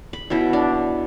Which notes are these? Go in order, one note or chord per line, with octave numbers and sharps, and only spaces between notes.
B5
B2 C#4 E4
D4